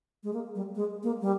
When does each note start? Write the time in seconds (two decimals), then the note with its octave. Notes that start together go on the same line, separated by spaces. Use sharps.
0.23 G#3
0.33 A#3
0.55 G3
0.75 G#3
1.03 A#3
1.21 G3